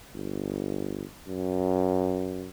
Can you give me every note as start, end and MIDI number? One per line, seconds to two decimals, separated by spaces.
0.14 1.04 31
1.28 2.48 42